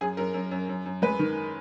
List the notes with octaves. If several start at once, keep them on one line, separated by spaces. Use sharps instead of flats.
F#2 G#4
F#2 A#4
F#2
F#2
F#2
F#2
G#3 B4
D#3